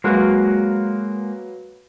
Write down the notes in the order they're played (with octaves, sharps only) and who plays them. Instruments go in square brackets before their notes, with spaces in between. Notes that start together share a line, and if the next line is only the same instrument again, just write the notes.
[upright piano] F#3 B4 F5 [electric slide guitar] G#3 A#3 F#4